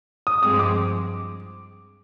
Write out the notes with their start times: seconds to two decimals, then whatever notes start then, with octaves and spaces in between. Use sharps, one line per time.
0.27 D#6
0.43 G2 F3 G#3 C4 D#6
0.59 D6